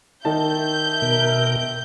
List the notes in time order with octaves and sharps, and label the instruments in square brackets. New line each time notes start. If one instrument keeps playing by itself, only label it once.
[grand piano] D#3 D#4 A5 [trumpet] E5 [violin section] G6
[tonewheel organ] B2 A#4